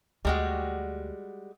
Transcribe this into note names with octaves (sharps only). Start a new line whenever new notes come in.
D2 G3 G#3 F#4